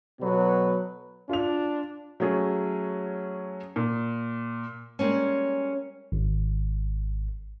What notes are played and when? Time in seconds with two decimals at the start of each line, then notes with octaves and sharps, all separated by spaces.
0.21 B2 F#3 B3 A4 B4
1.29 D4 F4 F7
2.20 F#3 A3 C#4 G#4
3.76 A#2
4.99 G3 G#3 A#3 C#4
6.12 G#1